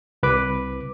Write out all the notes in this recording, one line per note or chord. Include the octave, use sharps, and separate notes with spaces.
C2 B4 D6